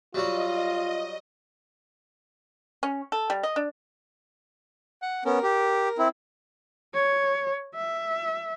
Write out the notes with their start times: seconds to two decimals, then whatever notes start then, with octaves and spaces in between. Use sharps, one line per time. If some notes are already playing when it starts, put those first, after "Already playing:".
0.14 F#3 G3 F4 F#4 D#5
2.83 C#4
3.12 A4
3.30 G3
3.43 D#5
3.56 D4
5.02 F#5
5.25 B3 C#4 A#4
5.43 G4
5.98 C4 E4
6.94 C#5
7.75 E5